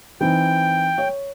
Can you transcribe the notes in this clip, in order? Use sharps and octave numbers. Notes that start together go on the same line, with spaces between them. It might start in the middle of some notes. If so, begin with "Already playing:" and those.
E3 C4 D#4 G5
C#5